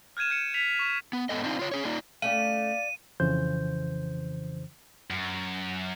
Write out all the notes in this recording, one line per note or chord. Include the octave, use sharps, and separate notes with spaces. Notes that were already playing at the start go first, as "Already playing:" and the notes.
F6 G6 G#6 D#7 E7
G6 C#7 E7
B6 F7
C#6
B3
G#2 E3 B3 A4 D#5
C4 D4 D#4 F4
F4 C#5
C#4 G#4 C#5
A#3 D#4 F4 D5
A3 C#4 G4 D5 F5 D#7
F2 C#3 E3 C5 G6
F#2